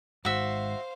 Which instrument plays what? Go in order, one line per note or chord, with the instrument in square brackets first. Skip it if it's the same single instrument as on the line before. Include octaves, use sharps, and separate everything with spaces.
[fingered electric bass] G#1 G#2 [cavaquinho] F#4 E5 [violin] C5 F5